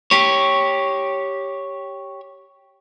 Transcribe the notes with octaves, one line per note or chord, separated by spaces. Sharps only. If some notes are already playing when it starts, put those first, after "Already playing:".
G4 C#5